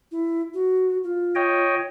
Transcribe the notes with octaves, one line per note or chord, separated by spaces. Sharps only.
E4
F#4
F4
C#5 D#5 G5